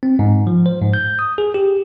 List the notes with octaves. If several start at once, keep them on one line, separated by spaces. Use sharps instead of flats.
C4
G#2
F3
C5
G#2
G6
D#6
G#4
G4